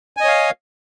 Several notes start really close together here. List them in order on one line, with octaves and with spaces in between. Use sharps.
G#5 D#5 C#5 F5